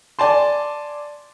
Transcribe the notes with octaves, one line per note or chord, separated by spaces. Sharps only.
D5 G#5 A5 C6